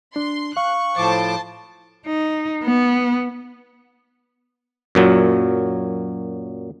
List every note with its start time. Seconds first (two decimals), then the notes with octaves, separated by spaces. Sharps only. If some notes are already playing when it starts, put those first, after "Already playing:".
0.16 D4 C6
0.57 F5 C#6 F#6
0.97 A2 F3 C5 A5 D6
2.06 D#4
2.64 B3
4.95 F#2 A#2 F#3